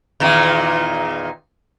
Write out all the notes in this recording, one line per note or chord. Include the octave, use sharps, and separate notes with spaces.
E2 A#2 D#3